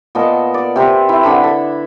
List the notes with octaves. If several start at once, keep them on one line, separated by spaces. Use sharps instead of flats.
A#2 B3 D#5 A5
D5
C3 C4 B4
E4
D3 D4 A4 B5
A4